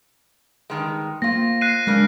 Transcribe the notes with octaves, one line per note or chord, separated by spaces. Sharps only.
G2 D#3 G#3
A#3 C4 F4 A#6
F#6 C7 D#7
C#3 G#3 A#3 D4